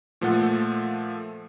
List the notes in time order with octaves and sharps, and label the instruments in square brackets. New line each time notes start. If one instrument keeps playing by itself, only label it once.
[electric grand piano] A#2 F3 A3 A4 F#5